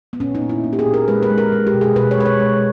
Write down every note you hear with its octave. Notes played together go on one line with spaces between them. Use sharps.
B3
A#2 C#4
D#4
A#3
E4
A#3
G4
G#4
A#2
A#4
G#3 B4
B4
G#3
A#4
G#3
G4
B2
G#4
B2 B4
C#5
G#3 B4
C#5
G#3